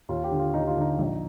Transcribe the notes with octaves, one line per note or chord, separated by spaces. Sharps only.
D#2 F4
G4
D3
F4
D#2 D#4
F4
D3 D#4
A#1